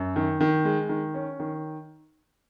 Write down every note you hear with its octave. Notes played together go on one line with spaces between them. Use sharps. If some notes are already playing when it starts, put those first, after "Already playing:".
Already playing: F#2
D#3
D#3
G#3
D#3
C#4
D#3